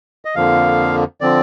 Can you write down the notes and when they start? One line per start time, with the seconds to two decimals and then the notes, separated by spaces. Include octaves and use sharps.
0.25 D#5
0.36 F2 D3 F3 A#3 F5
1.21 D3 F3 C4 D5